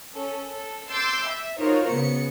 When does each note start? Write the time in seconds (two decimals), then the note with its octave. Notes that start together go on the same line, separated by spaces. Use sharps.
0.14 C#4 A4
0.49 A4
0.90 C6 D6 E6 G6 A6 C7
1.27 E5
1.59 D#4 F4 F#4 A#4 C5 C#5
1.89 C#3 B3 C#7